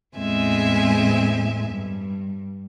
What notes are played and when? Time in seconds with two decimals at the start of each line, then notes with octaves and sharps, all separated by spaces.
0.16 E2 A2 G#3 C4 E5 G#5
1.69 G2